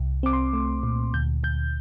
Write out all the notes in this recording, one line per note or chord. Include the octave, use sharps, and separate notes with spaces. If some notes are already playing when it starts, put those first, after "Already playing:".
Already playing: C2
C4 D6
C6
A3
A#2
D2 G6
D2 G6